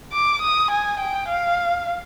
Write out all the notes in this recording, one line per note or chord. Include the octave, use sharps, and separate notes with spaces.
D6
D#6
G#5
G5
F5